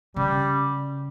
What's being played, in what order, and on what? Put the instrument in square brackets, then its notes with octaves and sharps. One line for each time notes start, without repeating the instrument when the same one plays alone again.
[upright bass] C#3 [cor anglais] G3